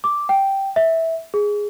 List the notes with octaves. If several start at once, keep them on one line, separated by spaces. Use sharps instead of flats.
D6
G5
E5
G#4